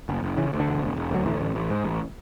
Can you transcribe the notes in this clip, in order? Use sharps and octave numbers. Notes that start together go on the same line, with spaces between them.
F#1
F#1
C#3 E3
D2
D3
E1
E1
E1
D2 F#3
A1 E3
A1
A1
G#2
A1